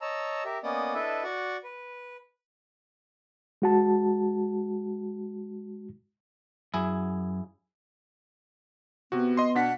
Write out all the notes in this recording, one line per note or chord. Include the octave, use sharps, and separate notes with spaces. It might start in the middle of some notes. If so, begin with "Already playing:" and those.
C#5 D#5 A5 A#5 E6
G4 A#4 E5
A#3 B3 C#4 D5 D#5 D#6
D4 E4 A4 B4 D#5 E5
F#4 D5 F#5 C#6
B4
G#3 F#4 A5
F#2 E4 G#4
C3 B3 F#4
D#5 C6
B2 D4 F#5 B6